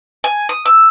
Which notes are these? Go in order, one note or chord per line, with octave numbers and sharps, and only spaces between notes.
G#5
D#6
E6